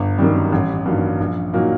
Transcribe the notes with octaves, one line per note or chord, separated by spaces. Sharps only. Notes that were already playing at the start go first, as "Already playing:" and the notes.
Already playing: G1
F#2 D#3 G3
A1
G2 D#3 F#3 A#3
A#1
A#2 F#3 A#3 D#4